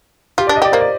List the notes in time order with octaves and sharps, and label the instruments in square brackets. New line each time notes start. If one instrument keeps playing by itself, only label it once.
[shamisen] F4 [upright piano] G4
[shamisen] D4 [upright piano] D5
[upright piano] D#5
[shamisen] G4 [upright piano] D5
[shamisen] A#3 [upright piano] C5
[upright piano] D5